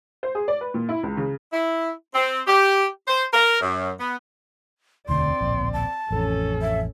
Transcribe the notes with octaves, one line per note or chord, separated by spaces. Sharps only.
C5
G#4
D5
B4
A#2
E4
C#2
C#3
E4
C4
G4
C5
A#4
F#2
B3
E1 D2 D3 C4 D5 C6
D1 A#1
A5
A1 F2 C#4 A4
E5